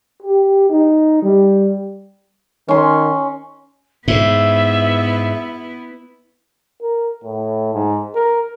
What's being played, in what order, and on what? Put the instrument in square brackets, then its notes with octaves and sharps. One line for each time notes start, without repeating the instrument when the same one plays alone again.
[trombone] G4
D#4
G3
[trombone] D#3 [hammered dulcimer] C#4 C6
[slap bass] G#2 [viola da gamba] B3 E4 [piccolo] E5
[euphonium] A#4
A2
G#2
A#4